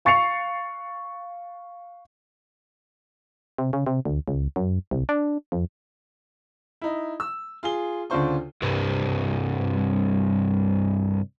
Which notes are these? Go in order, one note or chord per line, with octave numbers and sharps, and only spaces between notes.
F5 C#6 A6 C7 C#7 F7
C3
C#3
C3
D2
C#2
F#2
C2
D4
F2
D#4 E4
E6
F4 G#4 G7
D2 C#3 D4 F4 C5 C#6
C2 G2